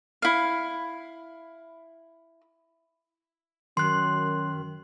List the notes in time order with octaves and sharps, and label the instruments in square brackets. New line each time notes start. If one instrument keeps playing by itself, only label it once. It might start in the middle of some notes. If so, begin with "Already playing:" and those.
[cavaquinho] E4 F5
[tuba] F#2 [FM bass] D#3 [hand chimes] C6 F#6